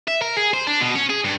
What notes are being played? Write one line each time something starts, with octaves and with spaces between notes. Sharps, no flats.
E5
A#4
G#4
C5
D4
B2
C#4
G#4
G2